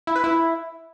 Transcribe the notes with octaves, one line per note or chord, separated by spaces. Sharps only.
E4
B4
E4